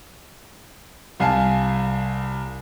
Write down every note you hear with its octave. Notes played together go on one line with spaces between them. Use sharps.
C2 F5 G#5 A5